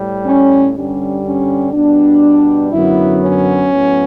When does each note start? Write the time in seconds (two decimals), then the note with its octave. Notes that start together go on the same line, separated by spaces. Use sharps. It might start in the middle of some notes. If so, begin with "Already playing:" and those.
Already playing: A2 G3
0.25 C#4
0.74 G2 D3 G3 C#4
1.24 C#4
1.73 B2 G3 B3 D4
2.72 F#2 D3 F#3 B3 E4
3.22 C#4
3.72 A2 F#3 B3